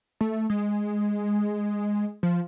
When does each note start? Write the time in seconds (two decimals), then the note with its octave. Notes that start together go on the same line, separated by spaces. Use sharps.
0.21 A3
0.50 G#3
2.23 F3